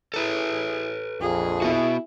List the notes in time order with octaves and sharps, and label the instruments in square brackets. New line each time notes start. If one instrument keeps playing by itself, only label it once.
[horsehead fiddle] E4 G#4 [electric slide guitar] A4 B4
[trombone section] A#1 F2 [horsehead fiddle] G#4
[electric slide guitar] B3 F#4 [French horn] E4